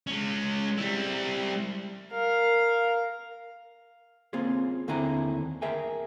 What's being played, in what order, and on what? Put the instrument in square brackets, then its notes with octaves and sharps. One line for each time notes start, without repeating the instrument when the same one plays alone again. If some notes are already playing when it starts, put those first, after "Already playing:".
[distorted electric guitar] G#3 C#4
G3 E4
[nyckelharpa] A#4 F5
[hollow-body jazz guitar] A#3 C4 C#4 F4 G#4
D#2 D3 C4 E4 G#5 A#5
G#4 A#4 E5 G5 G#5